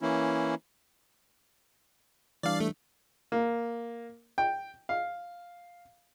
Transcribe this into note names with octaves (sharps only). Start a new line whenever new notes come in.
E3 A#3 C#4 E4
E3 G3 D4 D5 F5
A3
A#3
G5
F5